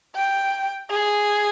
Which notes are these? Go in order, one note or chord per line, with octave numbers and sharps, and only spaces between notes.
G5
G#4